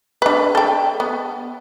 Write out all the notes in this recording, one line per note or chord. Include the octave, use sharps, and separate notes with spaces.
D4 B4
A4 G5
B3